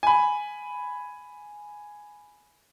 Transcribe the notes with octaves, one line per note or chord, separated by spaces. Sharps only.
G#5 B5